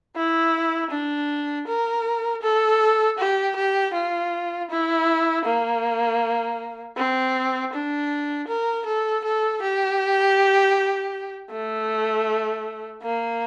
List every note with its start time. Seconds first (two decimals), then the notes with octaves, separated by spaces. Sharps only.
0.16 E4
0.90 D4
1.67 A#4
2.42 A4
3.18 G4
3.56 G4
3.93 F4
4.70 E4
5.45 A#3
6.96 C4
7.73 D4
8.48 A#4
8.86 A4
9.24 A4
9.62 G4
11.51 A3
13.02 A#3